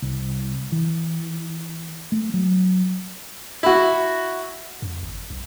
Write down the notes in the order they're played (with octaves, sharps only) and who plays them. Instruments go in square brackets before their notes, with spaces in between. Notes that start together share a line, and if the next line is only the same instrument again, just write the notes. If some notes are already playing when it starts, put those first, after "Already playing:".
[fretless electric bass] C2
E3
A3
F#3
[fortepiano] E4 F#4
[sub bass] F2
G1
B1